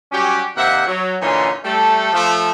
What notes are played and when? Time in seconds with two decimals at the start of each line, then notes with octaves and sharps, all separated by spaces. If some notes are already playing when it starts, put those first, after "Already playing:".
0.12 F#3 G3 C#4 F#4 G4
0.56 C3 D#3 A#3 C5 E5 F#5
0.87 F#3
1.22 A#2 D3 E3 C#4 D#4 C6
1.64 G3 A3 A4
2.13 F3 A3